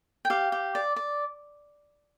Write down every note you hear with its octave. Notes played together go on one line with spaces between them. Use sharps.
G5
G4 F5
G4
D5
D5